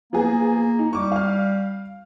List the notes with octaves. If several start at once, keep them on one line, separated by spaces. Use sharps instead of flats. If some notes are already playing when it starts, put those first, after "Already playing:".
F3 A#3 B3 G#4
D#4
G3 C#6 D6
F5 F6